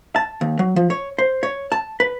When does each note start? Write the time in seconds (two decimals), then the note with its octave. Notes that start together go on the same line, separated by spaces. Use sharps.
0.16 A5
0.41 D#2
0.59 F#3
0.76 F3
0.90 C#5
1.18 C5
1.43 C#5
1.72 A5
2.00 B4